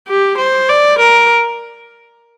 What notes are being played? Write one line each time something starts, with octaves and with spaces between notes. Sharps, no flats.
G4
C5
D5
A#4